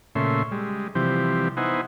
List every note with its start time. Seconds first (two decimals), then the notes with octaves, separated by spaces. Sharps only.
0.15 A#2 C#3 A3 C#4 E5 C6
0.52 G3 G#3
0.95 C3 E3 F3 G3 C4 G4
1.57 B3 D#4 E4 C5 F#5 G#5